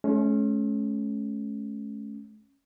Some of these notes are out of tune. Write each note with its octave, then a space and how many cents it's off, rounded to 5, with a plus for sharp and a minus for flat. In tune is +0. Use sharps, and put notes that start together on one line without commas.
A3 -45 C#4 +0